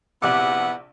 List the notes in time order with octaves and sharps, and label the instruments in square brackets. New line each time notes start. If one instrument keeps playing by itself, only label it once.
[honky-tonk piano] A#1 C3 D6 [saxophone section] B3 E4 F#5